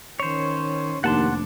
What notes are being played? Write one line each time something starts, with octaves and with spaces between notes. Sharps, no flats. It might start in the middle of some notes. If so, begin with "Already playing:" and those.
D#3 C#4 C5 C#5
F1 D#2 D4 F#5 A5 C6